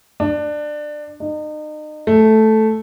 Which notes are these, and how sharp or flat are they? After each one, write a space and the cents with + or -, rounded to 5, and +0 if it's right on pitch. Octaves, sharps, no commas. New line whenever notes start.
D4 +20
D#4 -35
A3 -5